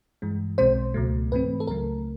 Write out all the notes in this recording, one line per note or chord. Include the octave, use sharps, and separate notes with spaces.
G2 E3 G#3
B1 B2 G#3 C4 C5
C#2 B2 F#3 A3
G#2 E3 A3 C4 B4
A4
C#2 C#3 F#3 A3 A#4